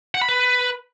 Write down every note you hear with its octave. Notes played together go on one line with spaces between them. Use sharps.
F#5
B5
B4